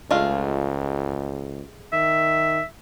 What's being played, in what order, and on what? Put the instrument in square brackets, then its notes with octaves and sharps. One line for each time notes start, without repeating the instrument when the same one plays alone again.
[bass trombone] C#2 [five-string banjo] G#3 A3 F4
[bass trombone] D#3 [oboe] E5